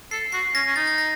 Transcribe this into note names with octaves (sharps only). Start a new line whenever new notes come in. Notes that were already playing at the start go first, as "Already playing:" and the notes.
A4 C7
F#4 C7
C#4 A#6
C#4
D#4 A6
A6
A#6